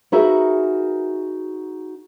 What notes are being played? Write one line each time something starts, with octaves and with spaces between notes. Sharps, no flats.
D#4 F#4 G#4 A#4 B4 E5